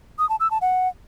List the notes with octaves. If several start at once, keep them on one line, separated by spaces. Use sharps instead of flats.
D#6
A5
E6
A5
F#5